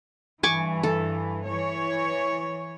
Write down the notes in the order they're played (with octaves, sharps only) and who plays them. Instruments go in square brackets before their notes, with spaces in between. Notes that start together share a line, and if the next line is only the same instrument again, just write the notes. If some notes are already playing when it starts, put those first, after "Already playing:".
[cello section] G2 E3 [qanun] G#5 C#6 D6
[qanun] A4
[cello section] E3 C#5